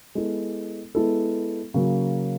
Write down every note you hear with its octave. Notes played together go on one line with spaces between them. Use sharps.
G#3 B3 E4 A4
G#3 B3 E4 A4
C#3 F#3 A#3